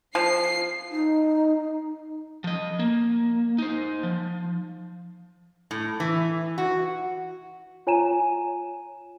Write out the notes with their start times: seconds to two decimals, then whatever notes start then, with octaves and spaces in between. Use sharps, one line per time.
0.15 F3 C7
0.91 D#4
2.44 F3 D#5
2.80 A#3
3.58 D#4 C5
4.03 F3
5.71 A2
6.00 E3
6.58 F#4
7.87 F4 C#5 G#5 A#5 D#7 E7